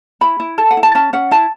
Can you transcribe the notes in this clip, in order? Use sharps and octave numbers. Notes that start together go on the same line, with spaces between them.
E4 B5
E4
A4 A5
F#5
E4
A5
C#4 A5
C#4 F#5
E4 A5